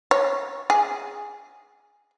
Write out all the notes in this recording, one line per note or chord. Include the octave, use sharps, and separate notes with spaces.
C#5
G#4